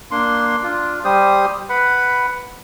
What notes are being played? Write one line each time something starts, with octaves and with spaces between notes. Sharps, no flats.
A#3 D4 C6
D4 F4
G3 G4 C5 D#6
B4 F#5 B5